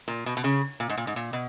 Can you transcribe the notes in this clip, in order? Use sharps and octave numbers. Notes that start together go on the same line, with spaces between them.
A#2
B2
B2
C#3
A#2
G#2
A#2
G#2
A#2
B2